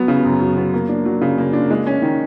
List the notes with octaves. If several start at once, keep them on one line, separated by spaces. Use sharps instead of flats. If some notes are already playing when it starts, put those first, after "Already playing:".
Already playing: F#3 B3
C#3
F#2
F#3
B3
A#3
D4
F#3
C#3
A#3
D4
G#3
C#4
D#3